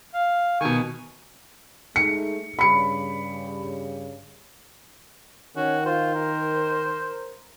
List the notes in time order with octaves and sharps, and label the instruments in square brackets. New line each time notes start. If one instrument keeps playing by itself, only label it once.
[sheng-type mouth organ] F5
[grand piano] B2 D#3 [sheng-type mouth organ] G#5 C#6
[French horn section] G#3 A3 D#4 [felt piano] C#7
[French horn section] G2 C#3 G3 [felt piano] B5 C#7
[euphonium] D#3 [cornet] C#4 [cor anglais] F#4
[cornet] F4 [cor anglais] C5
[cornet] A#4